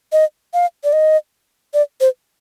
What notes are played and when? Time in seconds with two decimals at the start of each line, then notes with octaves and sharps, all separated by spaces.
0.12 D#5
0.54 F5
0.84 D5
0.93 D#5
1.74 D5
2.01 C5